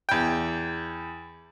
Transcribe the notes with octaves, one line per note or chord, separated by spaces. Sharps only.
E2 G5